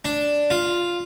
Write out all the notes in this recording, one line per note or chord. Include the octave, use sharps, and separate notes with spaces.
D4
F4